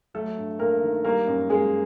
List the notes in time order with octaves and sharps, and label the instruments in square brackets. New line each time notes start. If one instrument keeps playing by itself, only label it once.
[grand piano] F#3 A3 A4
G2
G2 A#3 A#4
D#3
G3 A#3 A#4
F#2
F#2 G#3 G#4